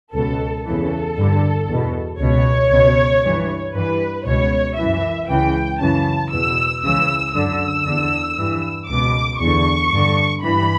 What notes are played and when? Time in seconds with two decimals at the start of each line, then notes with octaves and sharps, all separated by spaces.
0.14 C#2 B2 A4
0.66 E2 C#3 E3 A4
1.17 G2 D3
1.68 E2 B2
2.20 C#2 B2 C#5
2.71 C#2 B2
3.23 G2 E3
3.74 G2 E3 B4
4.26 C#2 B2 C#5
4.77 F#2 E3 E5
5.29 C#2 C#3 E3 G5
5.80 F#2 C#3 E3 A5
6.31 E2 B2 E6
6.83 C#2 C#3 E3 E6
7.34 F#2 D3 E6
7.86 E2 D3
8.38 G2 E3
8.89 C#2 B2 D6
9.40 E2 D3 C#6
9.92 G2 D3
10.43 G2 E3 B5